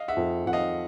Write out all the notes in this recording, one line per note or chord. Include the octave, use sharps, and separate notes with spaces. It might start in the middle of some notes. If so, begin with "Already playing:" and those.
Already playing: D#5 F5
E5 F#5
F2
F2 F#5
D#5 F5